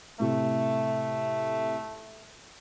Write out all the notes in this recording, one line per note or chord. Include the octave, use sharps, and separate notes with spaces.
A2 C3 A3